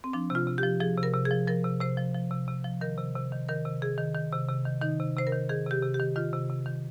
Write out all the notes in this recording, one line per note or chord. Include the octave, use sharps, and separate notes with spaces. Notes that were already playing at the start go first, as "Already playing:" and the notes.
C4
F3 D4
C3 F4
C3
G4
F3
F3 G#4
C3
A#4
C3
G#4
F3
F3 A#4
C3
C3 C5
F3
F3
C3
C3
F3
D#3 A#4
C3
C3
D#3
D#3 A#4
C3
C3 G#4
D#3
D#3
C3
C3
D#3
D#3 D#4
C3
C3 C5
A#4
D#3
D#3 G#4
C3 G4
C3
G4
D#3
D#3 F4
C3
C3
D#3